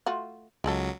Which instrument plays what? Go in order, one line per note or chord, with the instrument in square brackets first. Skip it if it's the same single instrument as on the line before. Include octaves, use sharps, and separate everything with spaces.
[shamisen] A3 F4 F#4
[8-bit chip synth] C#2 F#3 [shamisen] G#3 G#4 A4